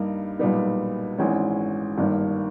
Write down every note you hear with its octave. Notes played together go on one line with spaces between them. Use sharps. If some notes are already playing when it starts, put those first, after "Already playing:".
Already playing: G2 G3 A#3 D#4
B1 A#2 G3 B3 D#4
G#1 G#2 E3 G#3 C#4
G1 G2 D#3 A#3